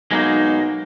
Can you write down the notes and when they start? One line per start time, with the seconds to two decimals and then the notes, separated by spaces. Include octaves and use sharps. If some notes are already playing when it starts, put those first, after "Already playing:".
0.11 B1 G#3 A#3 D#4